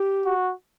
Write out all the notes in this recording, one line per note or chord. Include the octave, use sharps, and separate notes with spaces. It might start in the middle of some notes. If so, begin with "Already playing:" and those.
Already playing: G4
F#4